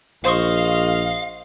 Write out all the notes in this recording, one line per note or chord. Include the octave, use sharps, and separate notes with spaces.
A#1 C5 D#5 F5 C#6